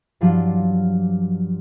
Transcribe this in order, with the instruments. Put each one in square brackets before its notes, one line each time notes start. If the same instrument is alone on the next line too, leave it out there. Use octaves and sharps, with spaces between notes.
[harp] G2 F3 F#3 D4 F4